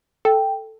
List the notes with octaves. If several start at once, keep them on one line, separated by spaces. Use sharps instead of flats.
A4 G5